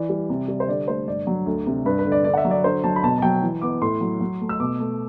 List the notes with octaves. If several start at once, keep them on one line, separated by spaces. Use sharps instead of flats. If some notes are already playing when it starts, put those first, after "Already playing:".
Already playing: E3 D5
G3
C3
G3
C5
D3 D5
A3 C5
G2 D5
F#3
D2
C3
G2 B4
B4
D3
D5
D3 D5
F#5
E5
F#3
D5
D3 C5
F#3 A5
B5
B2 A5
A5
F#3 G5
E3
B3 D6
A2 C6
F#3
F#3
A3
E6
B2 D6
A3